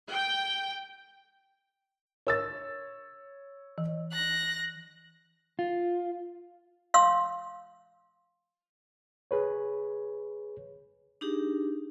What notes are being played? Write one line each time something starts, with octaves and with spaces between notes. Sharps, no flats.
G5
A#4 C#5 E6 A6
E3
F#6 A#6
F4
F5 C6 E6
G#4 B4 C#5
D4 D#4 G4 G#4